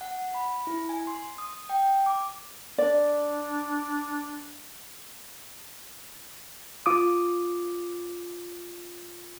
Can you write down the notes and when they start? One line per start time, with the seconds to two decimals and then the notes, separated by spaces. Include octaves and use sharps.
0.01 F#5
0.34 B5
0.67 E4
0.89 G#5
1.07 C6
1.38 D#6
1.70 G5
2.06 D6
2.78 D4 D5
6.86 F4 D6 D#6